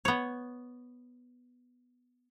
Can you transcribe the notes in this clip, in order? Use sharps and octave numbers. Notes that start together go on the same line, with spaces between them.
B3 C#5